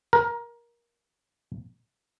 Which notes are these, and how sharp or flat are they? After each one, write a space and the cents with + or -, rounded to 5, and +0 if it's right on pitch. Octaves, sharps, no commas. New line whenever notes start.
A#4 +20